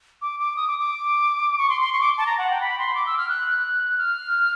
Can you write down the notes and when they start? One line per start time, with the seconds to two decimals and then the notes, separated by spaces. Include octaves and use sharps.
0.22 D6
0.40 D6
0.57 D#6
0.68 D6
0.79 D6
1.58 C#6
1.69 C6
1.81 C6
1.93 C#6
2.01 D6
2.18 A5
2.26 A#5
2.38 F#5
2.50 G5
2.61 B5
2.79 C6
2.95 D6
3.06 E6
3.18 F6
3.29 F#6
3.98 F6